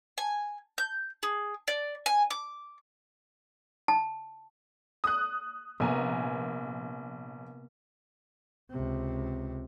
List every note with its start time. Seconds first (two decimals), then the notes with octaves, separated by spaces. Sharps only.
0.18 G#5
0.78 G6
1.23 G#4
1.68 D5
2.06 G#5
2.30 D6
3.88 A5
5.04 D#6 F#6
5.80 A#1 C3 A#3 B3 G#5 A#5
8.71 C#2 C3